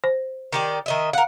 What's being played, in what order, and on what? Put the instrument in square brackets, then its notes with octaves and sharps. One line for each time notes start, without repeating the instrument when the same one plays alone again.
[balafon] C5
[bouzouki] D#3 G4 D5
D#3 D#5 E5
[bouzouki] A#4 F#5 [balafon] F5